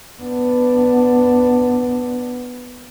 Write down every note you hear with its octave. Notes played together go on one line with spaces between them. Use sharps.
B3 D4